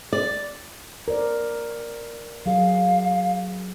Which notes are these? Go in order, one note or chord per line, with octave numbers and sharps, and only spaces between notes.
D5
A#4 C5 D5
F#3 G#4 F5